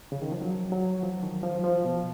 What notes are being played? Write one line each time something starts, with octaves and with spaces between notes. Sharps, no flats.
C#3
D#3
F3
F#3
F#3
F3
D#3
F3
F3
B2